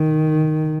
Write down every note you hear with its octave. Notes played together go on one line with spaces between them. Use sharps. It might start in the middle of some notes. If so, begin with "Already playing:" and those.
Already playing: D#3